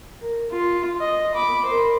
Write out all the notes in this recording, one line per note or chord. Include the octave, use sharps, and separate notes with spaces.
A#4
F4
D#5
B5 D6
A#4 C5